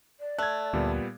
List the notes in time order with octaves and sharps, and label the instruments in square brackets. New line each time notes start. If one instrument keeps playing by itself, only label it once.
[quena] D5
[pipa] A3 [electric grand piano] F#6 G#6
[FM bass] D2 [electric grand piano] A#2 G3 B3